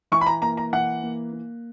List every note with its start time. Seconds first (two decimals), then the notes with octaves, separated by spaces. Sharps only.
0.12 E3 C#6
0.21 B5
0.26 A#5
0.42 A#3 A#5
0.57 A#5
0.73 E3 F#5
1.03 A#3
1.33 A#3